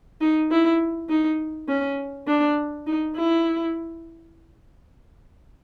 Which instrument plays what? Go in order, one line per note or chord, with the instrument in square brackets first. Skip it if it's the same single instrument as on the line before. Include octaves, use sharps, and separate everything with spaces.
[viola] D#4
E4
D#4
C#4
D4
D#4
E4